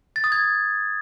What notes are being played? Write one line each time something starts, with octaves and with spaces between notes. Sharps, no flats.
A6
D#6
G#6